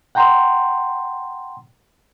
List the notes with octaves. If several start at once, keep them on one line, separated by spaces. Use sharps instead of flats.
F#5 G5 A#5 C6